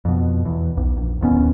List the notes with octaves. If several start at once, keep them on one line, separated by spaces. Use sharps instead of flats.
F2 B2
E2
B1
A#1
D1 D#2 B3 C#4